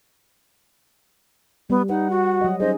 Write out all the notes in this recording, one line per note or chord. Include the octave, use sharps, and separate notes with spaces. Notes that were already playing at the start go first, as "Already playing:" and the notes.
G3 B3
D#4 B4 F#5
F#4
F#3 D#5
C#4 D#4 G#4 C5 D#5